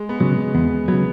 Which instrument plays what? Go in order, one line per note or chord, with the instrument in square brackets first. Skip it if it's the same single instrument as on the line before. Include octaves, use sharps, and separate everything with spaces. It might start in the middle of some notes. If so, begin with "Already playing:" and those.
Already playing: [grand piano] G#3
B3
[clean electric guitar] C#3 F#3
[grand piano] G#3
[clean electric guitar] E2 [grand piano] B3
[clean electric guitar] C#3 F#3 [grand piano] B3